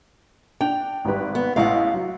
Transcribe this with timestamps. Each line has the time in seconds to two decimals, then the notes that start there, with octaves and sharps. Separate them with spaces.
0.61 D4 G5 F7
1.05 G#1 G3 B4
1.35 B3
1.56 A1 G#3 F5 F#5
1.94 F#3